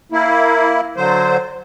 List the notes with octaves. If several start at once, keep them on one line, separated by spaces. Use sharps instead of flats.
A#3 E4
D3 F#3 C5